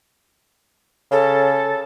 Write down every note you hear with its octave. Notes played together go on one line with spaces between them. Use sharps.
C#3 A4